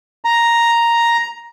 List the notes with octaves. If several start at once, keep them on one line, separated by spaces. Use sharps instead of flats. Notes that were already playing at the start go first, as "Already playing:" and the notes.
A#5